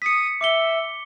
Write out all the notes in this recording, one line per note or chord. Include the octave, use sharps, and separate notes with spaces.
D#6 B6 C#7
E5 D6 C#7 G7